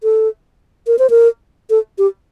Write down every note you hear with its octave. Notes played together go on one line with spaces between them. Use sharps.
A4
A#4
C5
A#4
A4
G4